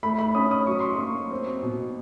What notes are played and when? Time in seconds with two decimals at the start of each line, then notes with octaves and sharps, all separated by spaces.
0.03 A3 B5
0.19 B5
0.35 C#4 D#6
0.51 D#6
0.67 F#3 C#6
0.80 C6
0.92 C#6
0.99 A#3
1.31 C4
1.63 B2